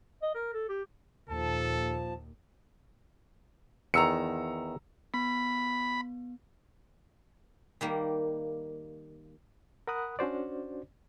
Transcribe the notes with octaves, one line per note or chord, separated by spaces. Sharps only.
D#5
A#4
A4
G4
D#2 A#2 F3 A4 A5
E2 D#3 A#5 E6 C#7
B3 B5
D#3 G3 A#3
A#4 F#5 B5 D#6 F#6
C#4 D4 F#4 C5 D5